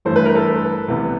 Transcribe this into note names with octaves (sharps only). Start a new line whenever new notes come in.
A1 G2 E3 A3 C5
B4
A#4
A4 B4
C2 C3 E3 G3 B3